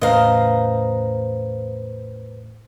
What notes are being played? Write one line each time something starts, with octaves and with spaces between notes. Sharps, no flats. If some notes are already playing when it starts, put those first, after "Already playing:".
E2 A2 C#3 B4 C5 D#5 F5 A#5